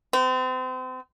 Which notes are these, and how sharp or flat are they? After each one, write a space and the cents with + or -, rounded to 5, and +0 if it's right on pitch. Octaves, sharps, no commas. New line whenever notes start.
C4 -35